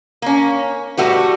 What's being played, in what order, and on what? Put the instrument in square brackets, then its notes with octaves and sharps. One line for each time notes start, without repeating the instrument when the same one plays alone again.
[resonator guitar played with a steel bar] A#3 C#4
A2 G3 A3 F#4 B4